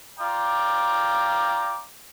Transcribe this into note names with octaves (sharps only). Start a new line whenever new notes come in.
F4 D5 G5 A#5 D6